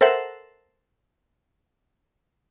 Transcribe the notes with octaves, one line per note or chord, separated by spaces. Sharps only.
A4 A#4 C5 E5 F#5